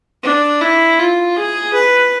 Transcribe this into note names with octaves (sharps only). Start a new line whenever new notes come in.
D4
E4
F4
G#4
B4